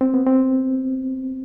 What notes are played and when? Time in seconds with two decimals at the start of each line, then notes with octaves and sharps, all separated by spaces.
0.01 C4
0.14 B3
0.27 C4